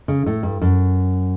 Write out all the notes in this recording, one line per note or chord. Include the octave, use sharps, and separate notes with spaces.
C#3
A2
G2
F#2